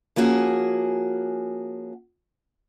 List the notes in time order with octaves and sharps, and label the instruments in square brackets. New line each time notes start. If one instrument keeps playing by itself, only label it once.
[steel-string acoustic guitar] F3 A#3 C#4 F#4 G#4